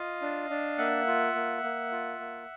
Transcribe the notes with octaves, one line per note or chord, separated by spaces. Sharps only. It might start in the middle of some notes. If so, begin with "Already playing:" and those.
Already playing: F4 D#5 F5
D4
D4
A#3 E5 F#5
F4
A#3
A#3
F4
A#3